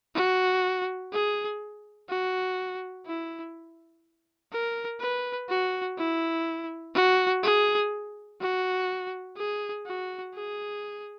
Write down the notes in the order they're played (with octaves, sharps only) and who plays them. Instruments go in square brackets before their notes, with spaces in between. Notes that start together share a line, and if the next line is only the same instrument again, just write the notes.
[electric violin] F#4
G#4
F#4
E4
A#4
B4
F#4
E4
F#4
G#4
F#4
G#4
F#4
G#4